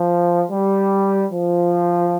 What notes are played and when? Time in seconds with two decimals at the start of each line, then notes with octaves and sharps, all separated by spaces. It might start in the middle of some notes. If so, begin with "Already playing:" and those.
Already playing: F3
0.50 G3
1.32 F3